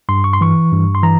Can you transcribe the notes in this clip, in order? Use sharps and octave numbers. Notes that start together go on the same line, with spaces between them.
G2 C6
C#6
C6
E3 C#6
G2
C6
E3 A#5